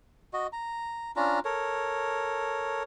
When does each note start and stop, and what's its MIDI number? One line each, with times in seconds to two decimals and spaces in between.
0.33 0.47 66
0.33 0.47 75
0.53 1.11 82
1.16 1.39 61
1.16 1.39 62
1.16 1.39 65
1.16 1.39 82
1.45 2.83 69
1.45 2.83 70
1.45 2.83 73